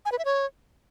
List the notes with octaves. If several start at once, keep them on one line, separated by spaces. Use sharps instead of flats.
G#5
B4
E5
C#5